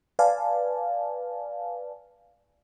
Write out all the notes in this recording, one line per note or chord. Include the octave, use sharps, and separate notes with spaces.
B4 D5 F5 G#5 A5